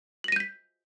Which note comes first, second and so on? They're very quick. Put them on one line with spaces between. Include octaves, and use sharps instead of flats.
F#7 A#6 D#7 G6 B6